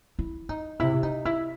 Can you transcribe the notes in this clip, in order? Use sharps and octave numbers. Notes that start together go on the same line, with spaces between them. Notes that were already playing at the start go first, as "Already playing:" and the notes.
E4
D#4
C3 E4
D#4
E4